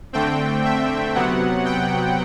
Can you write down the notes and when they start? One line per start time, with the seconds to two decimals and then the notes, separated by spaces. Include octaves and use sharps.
0.13 D3 A3 C4 G5
0.65 E5
1.15 C3 F#3 B3 F#5
1.65 G5